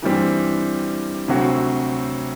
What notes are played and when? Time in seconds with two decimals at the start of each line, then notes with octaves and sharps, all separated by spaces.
0.02 G2 E3 G3 C4
1.28 D2 C3 F#3 C4 F#4